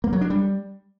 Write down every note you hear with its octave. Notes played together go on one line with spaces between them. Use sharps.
A#3
F#3
D4
G3